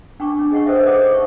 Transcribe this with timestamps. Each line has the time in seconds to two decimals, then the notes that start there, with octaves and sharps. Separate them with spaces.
0.20 D4 G5 A#5 C#6 D6
0.39 C#4 D4
0.51 G#4 D#5 F#5 C#6
0.66 A4 B4 C5 D#5 E5 G5
0.87 A4 C5 D5 F#5 D6 D#6
1.12 D#4 E5 C#6